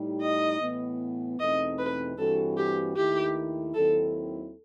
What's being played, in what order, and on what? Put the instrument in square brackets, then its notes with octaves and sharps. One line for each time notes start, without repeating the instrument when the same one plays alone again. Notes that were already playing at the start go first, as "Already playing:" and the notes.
Already playing: [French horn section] A2 G3 D#4 G4
[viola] D#5
[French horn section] A2 E3 B3
[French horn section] E2 B2 A3 C4 D#4 [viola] D#5
[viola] B4
[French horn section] G2 E3 G3 C4 F#4 [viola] A4
[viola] G4
[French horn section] D#2 D#3 A3 E4 [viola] G4
[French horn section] D#2 D#3 F#3 C4 E4 [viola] A4